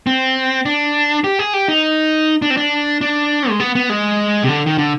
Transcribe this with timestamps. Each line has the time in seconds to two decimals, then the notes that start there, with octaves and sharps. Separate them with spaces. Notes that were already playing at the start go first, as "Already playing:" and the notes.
0.07 C4
0.66 D4
1.24 G4
1.39 G#4
1.54 G4
1.68 D#4
2.42 D4
2.50 C4
2.57 D4
3.01 D4
3.49 G#3
3.60 B3
3.75 B3
3.90 G#3
4.43 C3
4.49 D3
4.66 D#3
4.78 D3